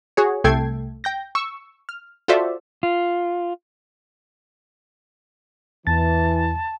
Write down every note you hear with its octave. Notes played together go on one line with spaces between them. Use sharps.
F#4 G#4 C#5
C2 A3 A4 G5 G#6 C7
G5 G6 A#6
C#6 E6
F6
F4 F#4 A4 C5 D5 E5
F4
E2 E3 A5 A6